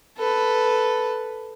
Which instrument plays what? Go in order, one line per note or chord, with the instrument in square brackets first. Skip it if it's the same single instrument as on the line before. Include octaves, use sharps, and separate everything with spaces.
[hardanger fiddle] A4 B4